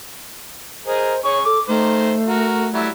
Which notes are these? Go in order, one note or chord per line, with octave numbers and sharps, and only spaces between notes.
G#4 A#4 C5 D#5
G#4 C#5 C#6
A4 D6
D#3 A3 C5
F#4 A#4
F#3 G3 E4